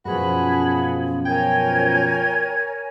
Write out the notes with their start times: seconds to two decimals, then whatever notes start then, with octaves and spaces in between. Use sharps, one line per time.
0.05 F#2 B2 F3 F#4 G#4 B5
1.26 A#4 C#5 G5 G#5 G#6